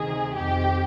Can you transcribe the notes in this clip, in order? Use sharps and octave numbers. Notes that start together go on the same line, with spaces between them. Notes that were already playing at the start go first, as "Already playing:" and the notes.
Already playing: D2 C3 D#3 G#4
F2 C3 D#3 G4